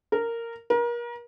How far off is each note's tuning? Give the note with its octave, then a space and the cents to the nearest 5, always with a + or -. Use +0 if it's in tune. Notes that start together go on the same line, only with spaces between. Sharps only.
A#4 -10
A#4 +35